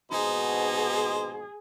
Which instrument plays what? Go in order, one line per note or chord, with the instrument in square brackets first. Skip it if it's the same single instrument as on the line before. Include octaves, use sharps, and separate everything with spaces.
[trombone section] A#1 G#2 B2 [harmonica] D#4 C5 [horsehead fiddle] G#4